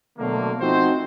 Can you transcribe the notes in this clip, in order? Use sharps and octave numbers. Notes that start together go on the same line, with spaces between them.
B2 D3 F#3 A3 A#3
F3 A3 C4 D#4 F#4 C5